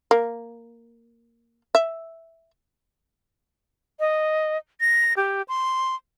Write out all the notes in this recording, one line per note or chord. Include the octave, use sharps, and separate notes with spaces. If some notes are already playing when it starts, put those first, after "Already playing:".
A#3
E5
D#5
A#6
G4
C6